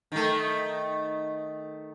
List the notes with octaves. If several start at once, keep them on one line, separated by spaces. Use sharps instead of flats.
D#3 A3